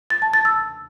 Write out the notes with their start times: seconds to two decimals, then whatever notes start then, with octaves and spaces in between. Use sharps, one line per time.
0.10 A6
0.22 A5
0.34 A6
0.45 E6